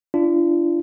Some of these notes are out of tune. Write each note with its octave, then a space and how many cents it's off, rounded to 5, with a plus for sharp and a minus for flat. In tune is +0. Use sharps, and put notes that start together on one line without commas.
D4 +0 F4 -40